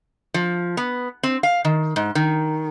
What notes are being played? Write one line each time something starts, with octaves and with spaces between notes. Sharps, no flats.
F3
B3
C4
F5
D#3
G#2
D#3